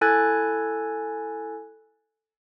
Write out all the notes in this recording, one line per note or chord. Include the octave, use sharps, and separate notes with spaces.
E4 A4 G#5 F#6 G#6 A6